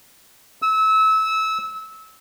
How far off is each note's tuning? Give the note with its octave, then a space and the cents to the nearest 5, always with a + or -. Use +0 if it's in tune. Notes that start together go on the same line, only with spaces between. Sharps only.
E6 -25